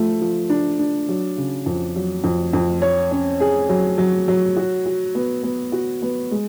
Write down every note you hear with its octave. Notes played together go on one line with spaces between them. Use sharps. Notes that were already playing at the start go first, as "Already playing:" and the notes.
Already playing: F3 A3
F3
D4
D4
F#3
C#3
F2
F#3
F2
F2
C#5
C#4
G#4
F#3
F#3
F#3
F#4
F#4
B3
B3
F#4
B3
G#3